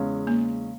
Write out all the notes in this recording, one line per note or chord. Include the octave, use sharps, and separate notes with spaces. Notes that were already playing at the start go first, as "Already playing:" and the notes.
Already playing: E2 C#3 G#3 C#4
A#3